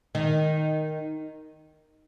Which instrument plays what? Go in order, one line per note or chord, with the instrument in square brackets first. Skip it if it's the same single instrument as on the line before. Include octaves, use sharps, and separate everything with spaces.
[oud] D#3